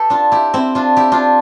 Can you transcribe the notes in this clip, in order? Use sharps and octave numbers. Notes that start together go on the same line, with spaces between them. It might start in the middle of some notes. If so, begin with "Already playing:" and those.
Already playing: G4 A4 B4
D4 F4
E4 G4
C4 E4
D4 F4
E4 G4
D4 F4